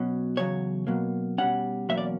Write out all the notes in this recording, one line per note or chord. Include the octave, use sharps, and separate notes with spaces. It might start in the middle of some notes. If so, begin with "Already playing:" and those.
Already playing: B2 F#3 C#4
E2 C#3 F#3 C#5
B2 F#3 A#3
B2 G3 C#4 F#5
E2 B2 F#3 A#3 C#4 E5
D5